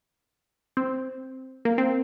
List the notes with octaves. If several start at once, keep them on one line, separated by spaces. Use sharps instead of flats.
C4
A#3
C4